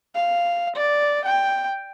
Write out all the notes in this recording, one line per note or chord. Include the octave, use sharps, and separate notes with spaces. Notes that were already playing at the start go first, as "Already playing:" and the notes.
F5
D5
G5